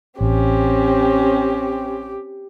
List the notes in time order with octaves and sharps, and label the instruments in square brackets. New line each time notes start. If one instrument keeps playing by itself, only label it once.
[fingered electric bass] A1 [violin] C4 C#4 [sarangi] G4